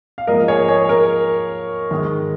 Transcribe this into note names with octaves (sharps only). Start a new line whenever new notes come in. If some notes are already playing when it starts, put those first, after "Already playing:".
F5
G#2 F3 A#3 A#4 D#5
G#4 C#5
G#4 C#5
A#4
G#2 D#3 G#3